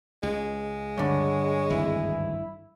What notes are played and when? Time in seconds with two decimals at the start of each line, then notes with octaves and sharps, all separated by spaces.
0.23 C#2 G#3
0.98 G2 D3 C#5
1.70 G#1 D2 E3 E4